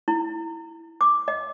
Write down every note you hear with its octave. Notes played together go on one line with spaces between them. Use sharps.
E4
D6
D#5